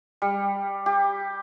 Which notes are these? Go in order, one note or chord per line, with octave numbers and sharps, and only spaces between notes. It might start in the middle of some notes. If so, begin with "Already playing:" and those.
G3
G4